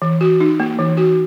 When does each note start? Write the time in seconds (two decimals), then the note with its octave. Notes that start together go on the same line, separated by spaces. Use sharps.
0.02 E3
0.21 F#4
0.40 D#4
0.60 A#3
0.79 E3
0.97 F#4